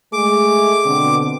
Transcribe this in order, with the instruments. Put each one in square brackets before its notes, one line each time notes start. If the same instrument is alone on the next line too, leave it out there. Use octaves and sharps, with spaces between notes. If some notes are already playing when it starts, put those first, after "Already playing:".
[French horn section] G#3 A3 G#4 [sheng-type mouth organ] D6
[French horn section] B2 D3 C4